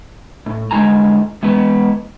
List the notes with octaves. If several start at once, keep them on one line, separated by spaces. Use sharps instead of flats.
A2
G2 D3 G#3 E4 G#5 A#5
E3 G#3 B3 B4